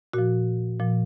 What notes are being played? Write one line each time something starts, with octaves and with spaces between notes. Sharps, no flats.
A#2 F3 F#4
A#2 F3